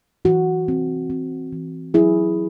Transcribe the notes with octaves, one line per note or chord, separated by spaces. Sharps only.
E3 F#4
C4
C4
E3
F#3 E4 G#4